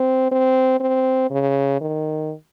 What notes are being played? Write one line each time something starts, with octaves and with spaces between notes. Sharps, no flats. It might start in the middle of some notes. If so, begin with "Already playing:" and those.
Already playing: C4
C4
C4
C#3
D#3